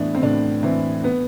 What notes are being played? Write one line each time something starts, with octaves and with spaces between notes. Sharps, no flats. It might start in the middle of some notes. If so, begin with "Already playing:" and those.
Already playing: A2 E3 B3 D4
C4
A2 D4
E3 C4
B3